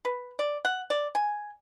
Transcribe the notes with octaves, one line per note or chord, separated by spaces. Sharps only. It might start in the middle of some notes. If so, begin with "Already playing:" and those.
B4
D5
F#5
D5
G#5